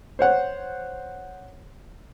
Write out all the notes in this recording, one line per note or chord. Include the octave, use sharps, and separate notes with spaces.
C5 C#5 F#5